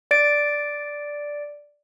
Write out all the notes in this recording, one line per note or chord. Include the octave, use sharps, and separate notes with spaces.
D5 A6 D7